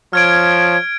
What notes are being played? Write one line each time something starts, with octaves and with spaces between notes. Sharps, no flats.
F3 C#5 F6 G#6 D7